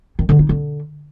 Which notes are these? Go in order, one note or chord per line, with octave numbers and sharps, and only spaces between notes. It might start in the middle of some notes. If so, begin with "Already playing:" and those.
D#3
D3
D#4
D3